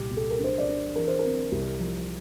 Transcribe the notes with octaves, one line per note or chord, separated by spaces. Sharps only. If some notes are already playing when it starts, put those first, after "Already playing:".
Already playing: C2 A#2 G4
C2
A4
A#4
D4 C5
D5
D4
E3 A#4
C5
C4 A#4
C2
F3